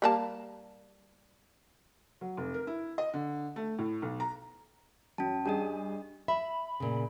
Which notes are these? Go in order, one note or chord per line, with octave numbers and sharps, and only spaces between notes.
G3 A#3 A5
F#3
F1
A#4
E4
D#5
D3
A3
A2
B1
A#5
F#2 C#4 A5
G2 D4 G#4 D#5 D#7
E5 B5
A#2 C#3